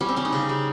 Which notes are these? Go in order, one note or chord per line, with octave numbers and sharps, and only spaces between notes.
G3 C#4
C4
G3 C#4
D#4
C#3
G3